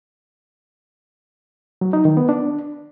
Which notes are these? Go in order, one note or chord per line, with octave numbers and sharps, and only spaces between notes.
F#3
D#4
D#3
B3
D4